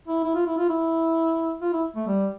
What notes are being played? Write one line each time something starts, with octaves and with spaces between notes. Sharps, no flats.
E4
E4
F4
E4
F4
E4
F4
E4
A3
G3